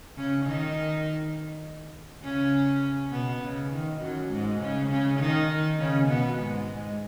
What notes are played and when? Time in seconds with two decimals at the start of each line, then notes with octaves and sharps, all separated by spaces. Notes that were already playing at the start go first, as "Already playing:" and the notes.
0.17 C#3 C#4
0.46 D#3 D#4
2.24 C#3 C#4
3.12 B2 B3
3.42 C#3
3.72 D#3
4.01 F#2 F#3
4.30 G#2 G#3
4.60 C#3 C#4
4.89 C#3 C#4
5.19 D#3 D#4
5.78 C#3 C#4
6.08 B2 B3
6.38 G#2 G#3